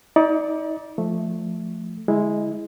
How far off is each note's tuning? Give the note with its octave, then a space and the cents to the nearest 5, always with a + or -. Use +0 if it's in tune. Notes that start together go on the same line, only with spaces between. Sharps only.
D#4 +35 D5 +0
F3 +0 A3 +0
D3 +0 G#3 +0 E4 -15